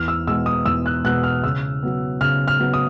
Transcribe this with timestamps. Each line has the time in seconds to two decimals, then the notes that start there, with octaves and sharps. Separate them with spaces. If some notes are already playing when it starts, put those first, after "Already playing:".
Already playing: E2 F6
0.08 E6
0.27 B2 G#3 B3 E6
0.46 D#6
0.66 E2 E6
0.86 F#6
1.04 B2 G#3 B3 F#6
1.24 F6
1.44 C#3 E6
1.83 F#3 B3
2.21 C#3 F6
2.48 F6
2.59 F#3 B3
2.73 D#6